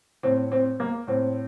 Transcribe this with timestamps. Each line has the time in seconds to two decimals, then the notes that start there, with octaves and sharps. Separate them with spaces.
0.23 A2 C4
0.52 C4
0.80 A#3
1.07 A2 C4